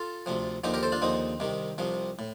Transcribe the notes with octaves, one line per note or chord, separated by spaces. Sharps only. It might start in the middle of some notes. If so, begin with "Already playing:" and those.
Already playing: F4 A4
D2 C3 F3
D#2 D3 F3 D#4 G4
G4 A#4
A4 C5
D4 F4
D#2 D3 F3 C4 D#4
C2 C3 D#3
C2 C3 F3
A2